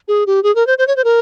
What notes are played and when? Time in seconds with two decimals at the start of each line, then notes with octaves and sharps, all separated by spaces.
0.08 G#4
0.27 G4
0.43 G#4
0.55 A#4
0.67 C5
0.78 C5
0.87 C#5
0.96 C5
1.04 A#4